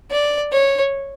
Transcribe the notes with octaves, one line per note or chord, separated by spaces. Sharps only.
D5
C#5